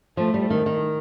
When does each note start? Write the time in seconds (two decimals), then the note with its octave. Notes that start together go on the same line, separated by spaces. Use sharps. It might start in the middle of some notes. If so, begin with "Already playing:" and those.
0.17 F3 A3
0.34 G3
0.50 D#3
0.66 D#3